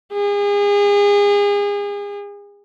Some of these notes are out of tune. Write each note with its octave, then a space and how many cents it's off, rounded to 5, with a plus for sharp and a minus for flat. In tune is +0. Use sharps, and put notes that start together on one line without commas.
G#4 -35